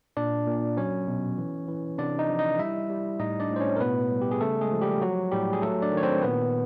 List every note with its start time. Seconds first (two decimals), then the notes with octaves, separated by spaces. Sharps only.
0.17 A#2 D4 D5
0.47 A#2
0.77 F#3 C#4 C#5
1.07 B2
1.38 E3
1.68 E3
1.98 C3 D4 D5
2.19 D#4 D#5
2.29 F3
2.39 D#4 D#5
2.59 G3 E4 E5
2.90 G3
3.20 A2 D#4 D#5
3.40 D4 D5
3.50 A2
3.56 C5
3.60 C#4 C#5
3.76 A#4
3.80 B2 B3 B4
4.11 G3
4.21 G4
4.31 G#4
4.41 C#3 A3 A4
4.61 G#3 G#4
4.72 F3
4.81 G3 G4
5.02 F#3 F#4
5.32 A2 G3 G4
5.53 G#4
5.62 F#3 A3 A4
5.82 D4 D5
5.93 D#3 C#5
6.03 C4 C5
6.22 A#2 B3 B4